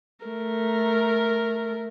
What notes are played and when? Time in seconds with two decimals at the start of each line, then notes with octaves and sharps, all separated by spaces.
0.25 A3 A#4